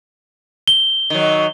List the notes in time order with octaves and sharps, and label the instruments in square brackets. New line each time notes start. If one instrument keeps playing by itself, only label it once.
[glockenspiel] G7
[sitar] D#3 F#3